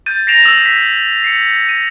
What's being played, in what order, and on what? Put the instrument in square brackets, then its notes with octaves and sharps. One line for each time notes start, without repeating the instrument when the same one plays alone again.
[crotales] G6 A6 D#7
A#6 C7 D7 E7 F7
D#6 E6
B6
C7 C#7
D#7